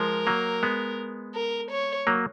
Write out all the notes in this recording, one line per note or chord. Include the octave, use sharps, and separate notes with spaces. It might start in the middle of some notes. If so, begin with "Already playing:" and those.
Already playing: F3 G#3 A#4
F#3 A#3
G#3 B3
A#4
C#5
F#3 A#3